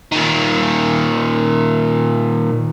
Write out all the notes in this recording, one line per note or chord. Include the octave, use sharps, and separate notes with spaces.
A#2 D#3